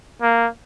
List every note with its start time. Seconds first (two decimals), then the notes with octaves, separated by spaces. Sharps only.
0.22 A#3